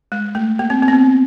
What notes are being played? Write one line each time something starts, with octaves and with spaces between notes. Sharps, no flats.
G#3
A3
A#3
C4
C4
B3
C4